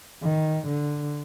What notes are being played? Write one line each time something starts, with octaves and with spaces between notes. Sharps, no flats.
D#3
D3